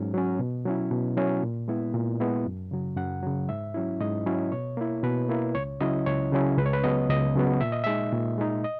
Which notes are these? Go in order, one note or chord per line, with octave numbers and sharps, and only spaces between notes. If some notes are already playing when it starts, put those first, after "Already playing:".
Already playing: G#2 F#3 C#4
F#3 C#4
B2
F#3 C#4 E4
B2
F#3 C#4 E4
A#2
G#3 B3 E4
A#2
G#3 B3 E4
F#2
C#3 F#3
F#2 F#5
C#3 F#3
G#2 E5
F#3 C#4 E4
G#2 D#5
F#3 C#4 E4
B2 C#5
A#3 E4
B2 B4
A#3 E4
C#2 C#5
C#3 F#3 C#4 E4 D#5
C#2 C#5
C#3 F#3 C#4 E4
C#2 B4
C#5
B4
C#3 F#3 B3 D#5
C#2 D#5
C#3 F#3 B3
A#2 E5
D#5
G#3 D#4 E5
A#2
G#3 D#4
D#5